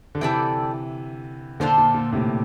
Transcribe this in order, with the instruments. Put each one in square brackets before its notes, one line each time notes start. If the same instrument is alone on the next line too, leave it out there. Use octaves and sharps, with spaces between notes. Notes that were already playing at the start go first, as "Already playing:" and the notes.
[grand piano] D3
[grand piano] C3 E3 [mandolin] E4 A4 D5 G5
[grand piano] A#2 D3 [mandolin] D4 F4 A4 C5
[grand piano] A#2
A#2
A2 C3